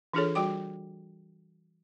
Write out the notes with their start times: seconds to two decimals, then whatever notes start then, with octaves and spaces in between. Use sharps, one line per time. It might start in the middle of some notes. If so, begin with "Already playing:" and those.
0.13 E3 D4 F4 G#4 A4 C#5
0.35 G3 F#4 G5 D6